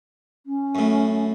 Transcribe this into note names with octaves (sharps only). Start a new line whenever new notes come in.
C#4
F#2 A2